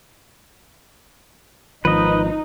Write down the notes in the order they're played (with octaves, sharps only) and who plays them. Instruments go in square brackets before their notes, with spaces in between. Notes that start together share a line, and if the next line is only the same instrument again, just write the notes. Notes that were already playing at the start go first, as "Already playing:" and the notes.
[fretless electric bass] G#1 D#3 F3 [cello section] D#4 [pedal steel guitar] B4 D#5